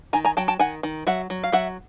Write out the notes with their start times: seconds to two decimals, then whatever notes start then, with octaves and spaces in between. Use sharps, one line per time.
0.13 D#3 G#5 A#5
0.25 G#5 A#5
0.37 F#3 G5 A5
0.48 G5 A5
0.59 D#3 F#5 G#5
0.83 D#3
1.07 F#3 E5 F#5
1.30 F#3
1.43 F5
1.52 F#3 E5 F#5